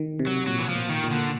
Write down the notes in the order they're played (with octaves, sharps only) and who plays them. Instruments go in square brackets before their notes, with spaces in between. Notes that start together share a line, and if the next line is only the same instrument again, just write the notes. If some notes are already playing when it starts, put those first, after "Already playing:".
Already playing: [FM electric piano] D#3
C3
[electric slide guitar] F#3
[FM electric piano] A#2 [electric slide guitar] F#3
[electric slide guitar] E3
F3
[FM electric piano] A#2
[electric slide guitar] D#3
[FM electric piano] A#2
[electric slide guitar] D3